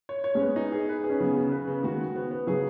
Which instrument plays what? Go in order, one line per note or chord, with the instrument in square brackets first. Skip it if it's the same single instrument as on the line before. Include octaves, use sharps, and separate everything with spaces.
[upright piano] C#5
C#5
[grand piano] G#3 C#4
[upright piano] B3
D#4
G#4
B4
G#4
[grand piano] C#4
[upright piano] C#3 [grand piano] F#3 B3
[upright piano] C#3
B4
C#3
[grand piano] D#3 G#3 [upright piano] F#4
[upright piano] F#4
B3
B3
[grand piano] C#3 F#3 [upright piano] G#4